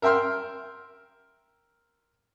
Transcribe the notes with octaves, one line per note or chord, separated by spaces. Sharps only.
A#4 E5 G5 C6 F6